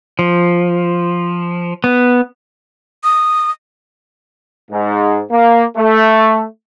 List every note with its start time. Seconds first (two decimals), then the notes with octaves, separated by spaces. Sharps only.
0.19 F3
1.84 B3
3.04 D#6
4.71 G#2
5.31 A#3
5.77 A3